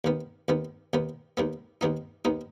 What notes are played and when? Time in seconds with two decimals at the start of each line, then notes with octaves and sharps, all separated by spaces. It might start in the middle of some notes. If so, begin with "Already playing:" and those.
0.04 D#2 D#3 B3
0.48 D#2 D#3 B3
0.93 D#2 D#3 B3
1.37 D#2 D#3 B3
1.81 D#2 D#3 B3 D#4
2.25 D#2 D#3 B3 D#4